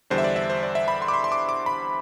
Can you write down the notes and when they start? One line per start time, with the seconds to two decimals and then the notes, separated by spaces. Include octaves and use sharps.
0.10 E2 D3 G3 D4 C5
0.18 E5
0.24 D5
0.36 E5
0.50 C5
0.63 D5
0.75 E5
0.88 B5
1.02 C6
1.08 D6
1.14 C6
1.24 C6
1.32 D6
1.49 D6
1.66 B5